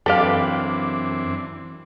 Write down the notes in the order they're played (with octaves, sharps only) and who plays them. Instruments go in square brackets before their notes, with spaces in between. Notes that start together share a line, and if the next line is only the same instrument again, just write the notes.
[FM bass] F#2 [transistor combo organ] E3 C4 D4 [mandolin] G4 B4 [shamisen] A4 F5